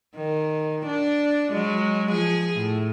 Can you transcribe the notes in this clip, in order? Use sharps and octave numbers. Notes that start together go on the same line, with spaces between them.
D#3
D4
F#3 G#3
F3 G#4
A2